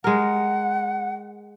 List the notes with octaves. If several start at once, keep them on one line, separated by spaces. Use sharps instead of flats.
G#3 A#4 F#5